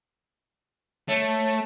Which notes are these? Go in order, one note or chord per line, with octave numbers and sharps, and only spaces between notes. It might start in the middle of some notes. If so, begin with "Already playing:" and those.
A3 C#5